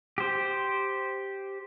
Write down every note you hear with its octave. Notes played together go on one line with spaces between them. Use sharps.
G4 C5